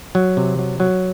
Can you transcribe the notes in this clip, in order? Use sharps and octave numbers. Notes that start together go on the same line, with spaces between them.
F#3
C3
F#3
F#3